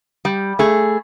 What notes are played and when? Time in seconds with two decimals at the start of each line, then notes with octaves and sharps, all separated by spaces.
0.25 G3
0.59 A3 G#4